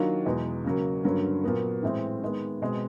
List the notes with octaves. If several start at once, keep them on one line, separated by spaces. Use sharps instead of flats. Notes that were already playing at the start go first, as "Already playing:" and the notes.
Already playing: D#3 F#3 A#3 D4 F4
E2 B2 G#3
C#3 F#3 A#3
G2 D3 F#3 A#3 C#4
A#2 F#3 B3
A2 E3 G#3 C4
D#3 G#3 B3
B2 G#3 C4